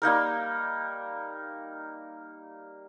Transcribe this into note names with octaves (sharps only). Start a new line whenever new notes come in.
G3 A#3 D#4 A#4